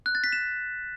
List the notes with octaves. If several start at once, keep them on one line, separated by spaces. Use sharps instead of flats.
F#6
A6
B6
E7